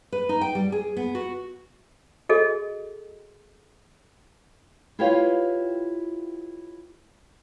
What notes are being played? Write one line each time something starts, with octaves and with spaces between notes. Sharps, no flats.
B4
D#4
G5
G3
G#4
B3
F#4
F#4 G#4 A4 D#5
E4 F4 G4 B4 C#5 F5